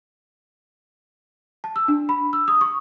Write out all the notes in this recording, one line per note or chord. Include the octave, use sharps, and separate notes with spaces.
A5
E6
D4
B5
E6
D#6
C#6